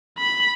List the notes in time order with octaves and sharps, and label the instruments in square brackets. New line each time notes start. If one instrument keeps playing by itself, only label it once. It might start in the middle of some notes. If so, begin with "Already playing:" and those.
[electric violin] B5